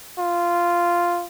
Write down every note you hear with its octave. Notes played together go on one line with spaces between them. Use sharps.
F4